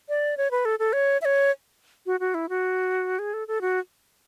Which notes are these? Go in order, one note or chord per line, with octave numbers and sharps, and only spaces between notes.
D5
C#5
B4
A4
A4
C#5
E5
C#5
F#4
F#4
E4
F#4
G#4
A4
A4
F#4